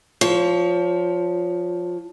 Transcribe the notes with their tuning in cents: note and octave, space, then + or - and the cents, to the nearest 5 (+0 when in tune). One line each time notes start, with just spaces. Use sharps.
F3 +10 C#5 +30